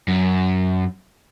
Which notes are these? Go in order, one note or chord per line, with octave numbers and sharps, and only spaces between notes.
F#2